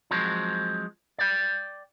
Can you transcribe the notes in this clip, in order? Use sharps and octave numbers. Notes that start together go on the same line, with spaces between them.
F3 F#3 G#3 C4
D5 G5